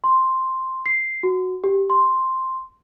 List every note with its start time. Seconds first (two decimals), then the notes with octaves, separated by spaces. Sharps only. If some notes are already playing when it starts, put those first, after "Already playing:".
0.04 C6
0.86 C7
1.23 F#4
1.64 G4
1.90 C6